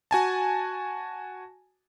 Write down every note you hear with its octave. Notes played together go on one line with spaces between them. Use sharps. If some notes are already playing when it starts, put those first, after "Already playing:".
F#4 G#5 A5